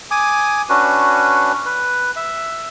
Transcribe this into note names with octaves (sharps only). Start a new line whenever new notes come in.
G#5 D6 D#6
C#4 D4 F#4 B4
B4
E5